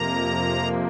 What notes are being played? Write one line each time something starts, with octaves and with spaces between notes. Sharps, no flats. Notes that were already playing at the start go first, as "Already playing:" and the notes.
Already playing: F2 C3 F3 A#3 A#5